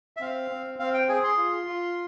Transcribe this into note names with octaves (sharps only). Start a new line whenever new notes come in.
E5
C4 F5
C4
C4 F5
G5
G#4 G#5
C6
F4
F4